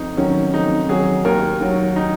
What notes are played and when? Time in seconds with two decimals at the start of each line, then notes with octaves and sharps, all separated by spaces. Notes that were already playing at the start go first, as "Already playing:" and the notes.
Already playing: F2 D#4
0.17 D#3 F#3 C#4
0.54 F2 D#4
0.89 D#3 F#3 G#4
1.25 D#2 A#4
1.61 D#3 F#3
1.96 D#4